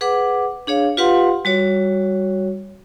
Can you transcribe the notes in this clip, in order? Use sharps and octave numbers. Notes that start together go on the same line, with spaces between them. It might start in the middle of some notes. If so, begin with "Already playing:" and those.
G#4 B4 F#5 D6
D4 G#4 C#5 F5
F4 G4 B4 F5 F#5 C6
G3 F#4 C#5